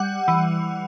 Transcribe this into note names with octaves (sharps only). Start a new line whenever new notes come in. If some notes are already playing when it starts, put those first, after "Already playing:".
Already playing: G3 F#5
E3